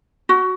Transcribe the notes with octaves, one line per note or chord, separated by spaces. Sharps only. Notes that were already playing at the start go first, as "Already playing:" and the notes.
F#4